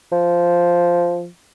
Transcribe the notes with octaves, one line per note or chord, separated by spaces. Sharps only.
F3